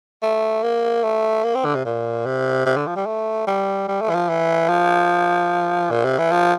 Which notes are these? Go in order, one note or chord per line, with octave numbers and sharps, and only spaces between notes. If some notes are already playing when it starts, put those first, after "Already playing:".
A3
A#3
A3
A#3
C4
D3
C3
A#2
C3
C3
D3
F3
G3
A3
G3
G3
A3
E3
F3
E3
F3
A#2
C3
E3
F3